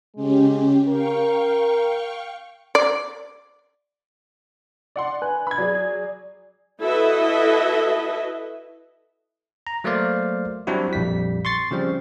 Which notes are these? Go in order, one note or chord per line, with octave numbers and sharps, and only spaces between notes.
C#3 G#3 C#4 G4
A#4 F5 G5 C#6
D5
D5 F#5 C6
B4 G#5 F#6
B5 G#6
F#3 G#4 D5
E4 F#4 A4 B4 D#5 E5
A#5
F#3 A3 A#3 C5 D5 F5
F#3 G3 C4 D4 E4 F#4
A#1 F2 G3 B6
C6 C#6 A6 C7
C#3 F3 G3 C4